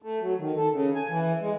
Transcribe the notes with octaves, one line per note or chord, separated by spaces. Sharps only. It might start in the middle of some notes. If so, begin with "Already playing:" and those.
A3
F#3
D#3
A4
C#3
G#5
E3
G#3